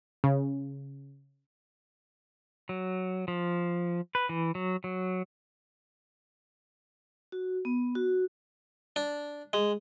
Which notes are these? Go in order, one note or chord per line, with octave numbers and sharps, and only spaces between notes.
C#3
F#3
F3
B4
E3
F#3
F#3
F#4
B3
F#4
D4
G#3